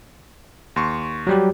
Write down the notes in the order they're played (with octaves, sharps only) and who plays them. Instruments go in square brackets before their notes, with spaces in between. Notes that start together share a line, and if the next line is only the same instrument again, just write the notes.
[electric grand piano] D#2 C6 C#6
[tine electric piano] F#3 G3 G4